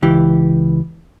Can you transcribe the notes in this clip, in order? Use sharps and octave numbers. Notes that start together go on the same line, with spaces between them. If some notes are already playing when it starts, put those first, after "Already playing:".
C#2 E3 G4